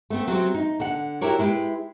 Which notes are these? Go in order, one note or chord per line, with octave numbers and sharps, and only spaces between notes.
A3 B3 C4
F#3 G3 C4 F#4
D#4
D3 F#5
E4 F#4 G4 A#4 C#5 D5
G#3 E4 G4 B4